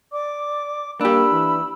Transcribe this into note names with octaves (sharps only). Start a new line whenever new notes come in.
D5 D6
A#3 D4 G4 B5 E6
E3